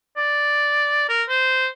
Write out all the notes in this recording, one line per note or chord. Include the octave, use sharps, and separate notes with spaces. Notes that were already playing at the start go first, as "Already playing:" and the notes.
D5
A#4
C5